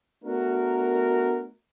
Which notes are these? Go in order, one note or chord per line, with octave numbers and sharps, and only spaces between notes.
A3 B3 D4 F#4 A#4